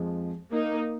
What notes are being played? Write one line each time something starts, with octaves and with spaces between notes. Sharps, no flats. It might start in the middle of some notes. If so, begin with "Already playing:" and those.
Already playing: F2 F3 G#3
A#3 D#4